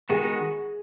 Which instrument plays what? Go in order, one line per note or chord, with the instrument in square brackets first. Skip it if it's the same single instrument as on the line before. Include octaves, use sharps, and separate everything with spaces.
[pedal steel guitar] D#3 G#3 B3 D#4 F#4 [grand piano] G#4